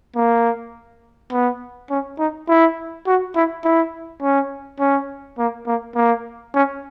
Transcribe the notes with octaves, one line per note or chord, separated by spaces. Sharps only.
A#3
B3
C#4
D#4
E4
F#4
E4
E4
C#4
C#4
A#3
A#3
A#3
C#4